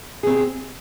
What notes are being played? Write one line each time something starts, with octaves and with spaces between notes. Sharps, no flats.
C4 G4 G#4